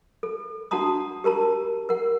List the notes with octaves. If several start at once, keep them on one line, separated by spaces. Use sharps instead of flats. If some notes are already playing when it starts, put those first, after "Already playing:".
A4
D4 F#4 F#5 A5 A#5 D#6
G4 A#4 A5 A#5
A#4 F#5